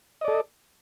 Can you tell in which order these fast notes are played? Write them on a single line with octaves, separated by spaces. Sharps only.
D#5 D5 A4